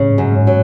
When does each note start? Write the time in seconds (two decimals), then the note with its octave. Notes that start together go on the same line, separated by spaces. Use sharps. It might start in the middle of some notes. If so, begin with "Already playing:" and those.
Already playing: A2 C#3
0.10 G#2
0.18 F#2
0.32 G#2
0.47 F#3